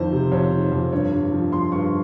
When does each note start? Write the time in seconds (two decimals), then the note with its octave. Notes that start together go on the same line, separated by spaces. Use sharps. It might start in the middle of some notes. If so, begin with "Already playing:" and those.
Already playing: F2 D#3 C5
0.12 C3
0.32 F2 C#5
0.52 D#3
0.72 F2
0.92 G2 C#5
1.12 G2
1.32 F3
1.52 F3 C6
1.72 G2 C#6